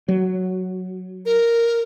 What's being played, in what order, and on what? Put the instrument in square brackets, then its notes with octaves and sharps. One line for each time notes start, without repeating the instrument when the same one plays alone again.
[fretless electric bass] F#3
[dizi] A#4